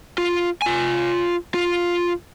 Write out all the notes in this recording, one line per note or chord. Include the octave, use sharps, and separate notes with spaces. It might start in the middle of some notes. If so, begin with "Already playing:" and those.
F4
F4 G#5
F4